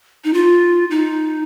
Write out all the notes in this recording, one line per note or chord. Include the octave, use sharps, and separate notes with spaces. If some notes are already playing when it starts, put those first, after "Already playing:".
D#4
F4
D#4